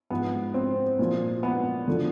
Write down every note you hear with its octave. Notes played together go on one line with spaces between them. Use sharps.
G#2 F3 B3
C4
A#2 F3
B3
D3 F3